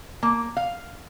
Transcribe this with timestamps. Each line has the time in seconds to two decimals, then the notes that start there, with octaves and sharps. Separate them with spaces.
0.23 A#3
0.57 F5